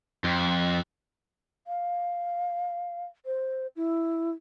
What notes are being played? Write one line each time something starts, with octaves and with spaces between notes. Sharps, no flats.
F2 F4 G5
F5
C5
E4